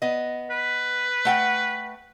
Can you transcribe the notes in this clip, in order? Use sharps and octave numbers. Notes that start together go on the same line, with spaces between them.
B3 D#5
B4
A3 F#5 G5